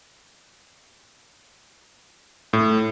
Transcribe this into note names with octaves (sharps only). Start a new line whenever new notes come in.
A2